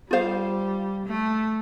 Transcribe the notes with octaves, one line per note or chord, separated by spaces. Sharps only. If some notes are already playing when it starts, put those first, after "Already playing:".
G3 F4 C5 F5
A3